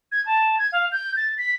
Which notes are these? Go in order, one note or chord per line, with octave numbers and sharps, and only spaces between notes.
G#6
A5
G#6
F5
G6
A6
B6